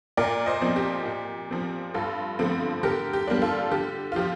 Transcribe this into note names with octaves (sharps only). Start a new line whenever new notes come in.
A#2 A#4 D5
C5 D#5
F3 C4
G4
A#2
F3 C4
G2 F4 A4
D3 F3 A3 C4
D3 G4 A#4
G4
G3 A#3 D4
F4 A4
D3 G4
F4
F3 G4